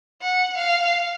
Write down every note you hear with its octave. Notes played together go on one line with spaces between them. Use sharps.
F#5
F5